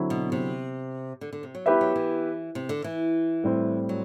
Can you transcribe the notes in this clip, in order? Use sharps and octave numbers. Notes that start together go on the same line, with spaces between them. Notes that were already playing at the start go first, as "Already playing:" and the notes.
Already playing: D3 F#3 C4 E4
B2
C3
D3
D3
C3
F#3
G3 B3 E4 G4 B4 E5
F#3
E3
C3
D3
E3
A2 G3 C4
F#3